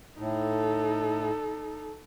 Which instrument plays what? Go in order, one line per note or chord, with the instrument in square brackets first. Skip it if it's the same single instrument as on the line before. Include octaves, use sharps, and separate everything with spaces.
[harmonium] A2 [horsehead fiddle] D#4 A4